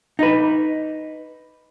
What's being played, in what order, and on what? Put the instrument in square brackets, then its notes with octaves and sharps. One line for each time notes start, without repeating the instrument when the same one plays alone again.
[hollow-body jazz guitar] D#4 B4